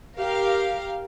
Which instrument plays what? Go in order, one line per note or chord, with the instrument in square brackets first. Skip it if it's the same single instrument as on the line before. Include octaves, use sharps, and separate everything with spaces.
[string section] G4 A#4 F5